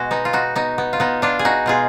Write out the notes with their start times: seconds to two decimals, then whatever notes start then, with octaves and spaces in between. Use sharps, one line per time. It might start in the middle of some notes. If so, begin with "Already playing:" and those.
Already playing: B2 G#3 F#4
0.11 B3 D#4
0.25 F4
0.33 D#4 F#4
0.56 B3 D#4
0.78 B3
0.93 F4
1.00 B3 D#4
1.22 D4 F4
1.39 G#4
1.45 D#4 F#4
1.66 B2 G#3 F4 G#4